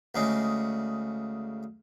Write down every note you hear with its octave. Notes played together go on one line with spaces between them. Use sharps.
D2 C#3 G#3